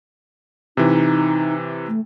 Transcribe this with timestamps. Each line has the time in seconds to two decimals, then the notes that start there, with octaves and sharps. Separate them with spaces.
0.77 C3 E3 D#4
1.88 A3